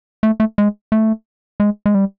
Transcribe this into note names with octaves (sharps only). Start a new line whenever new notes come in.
A3
A3
G#3
A3
G#3
G#3
G3